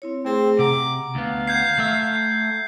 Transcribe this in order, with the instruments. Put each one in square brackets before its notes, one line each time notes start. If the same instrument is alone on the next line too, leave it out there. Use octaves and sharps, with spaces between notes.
[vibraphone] C4 E4 C#5
[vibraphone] A3 G#4 [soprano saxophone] C4
[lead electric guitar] C3 [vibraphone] F#5 A#5 [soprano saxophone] D6
[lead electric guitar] D2 B3 [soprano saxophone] F5
[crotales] G6 G#6 C7
[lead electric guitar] A3 E5